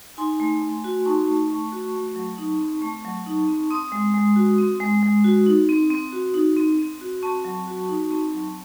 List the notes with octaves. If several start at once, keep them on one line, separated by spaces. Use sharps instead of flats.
D#4 G#5 C6
A3
A3
F#4
D#4 A5 C#6
A3
A3 A5 C#6
F#4
A3
F#3
D#4
C4
A3 A5 C#6
F#3
D#4
C4
C4 C6 D#6
G#3
G#3
F#4
C4
G#3
G#3
F#4
D#4
C4
C4
F#4
D#4
C4
C4
F#4
C4 A5 C#6
F#3
F#4
D#4
C4
F#3